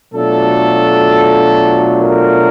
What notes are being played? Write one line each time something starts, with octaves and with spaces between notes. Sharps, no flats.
B2 F#3 A3 D4 F4 A4
A#4